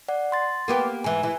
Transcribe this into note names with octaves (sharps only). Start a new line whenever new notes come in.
D5 F#5
C6 A6
A#3 B3 G4
G#2 E3 G#5
E3